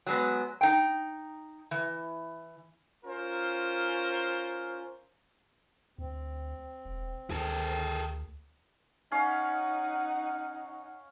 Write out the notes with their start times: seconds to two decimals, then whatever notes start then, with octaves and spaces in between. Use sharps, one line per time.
0.07 F#3 G#3 B3
0.61 D#4 G5
1.71 E3
3.05 C#4 F4 A#4 C5
5.98 D2 C4
6.85 E1
7.30 D2 D#3 G#4 A4
9.12 C#4 D#4 F5 F#5